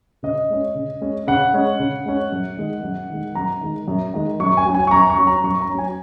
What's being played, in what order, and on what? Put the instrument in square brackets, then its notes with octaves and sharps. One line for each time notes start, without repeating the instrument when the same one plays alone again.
[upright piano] C#3 D#5
G#3 C#4
C#3
G#3 C#4
C#3 F#5
G#3 C#4
C#3
G#3 C#4
F#2
D#3 G#3
F#2
D#3 G#3
F#2 A#5
D#3 G#3
F#2
D#3 G#3
F#2 C#6
G#5
F#3 C#4
G#5
C#6
F#2 A#5
C#6
F#3 C#4
A#5
F#2 C#6
A#5
C#4
F#3 G#5